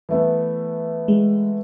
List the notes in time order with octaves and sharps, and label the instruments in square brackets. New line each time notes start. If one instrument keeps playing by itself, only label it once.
[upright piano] E3 A3 B3
[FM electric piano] G#3